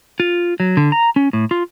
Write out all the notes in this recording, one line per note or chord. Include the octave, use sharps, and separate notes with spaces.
F4
F#3
D3
A#5
C#4
A2
F4